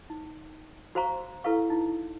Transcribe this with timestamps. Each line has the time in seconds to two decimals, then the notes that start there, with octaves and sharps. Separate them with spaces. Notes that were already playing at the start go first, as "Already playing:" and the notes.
0.10 D#4
0.95 F#4 C5 F5 A#5 C#6
1.44 E4 A4 B4 F5 C#6
1.70 D#4 E4